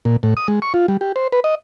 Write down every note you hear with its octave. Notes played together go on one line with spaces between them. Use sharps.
A#2
A2
D#6
G#3
C#6
F4
G3
G4
C5
B4
D#5